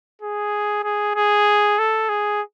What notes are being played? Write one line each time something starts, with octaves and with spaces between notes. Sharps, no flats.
G#4
G#4
G#4
A4
G#4